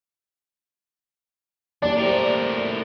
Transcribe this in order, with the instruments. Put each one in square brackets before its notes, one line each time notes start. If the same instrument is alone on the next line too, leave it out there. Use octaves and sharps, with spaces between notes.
[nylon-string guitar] E3 G3 [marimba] A#3 [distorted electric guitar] D4 [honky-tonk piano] D5
[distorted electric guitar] A2 A#4 [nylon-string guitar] E4 G4 C5